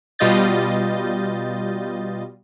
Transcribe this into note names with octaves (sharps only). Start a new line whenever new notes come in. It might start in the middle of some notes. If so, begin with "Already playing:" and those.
B2 G3 F4 D#5 G6 A6